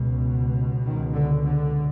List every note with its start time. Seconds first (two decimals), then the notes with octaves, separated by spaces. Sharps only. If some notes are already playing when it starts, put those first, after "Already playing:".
Already playing: C#2 B2
0.86 D#3
1.14 D3
1.44 D3